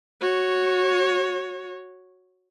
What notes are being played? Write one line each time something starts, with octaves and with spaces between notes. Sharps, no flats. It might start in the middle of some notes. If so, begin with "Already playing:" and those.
F#4 C#5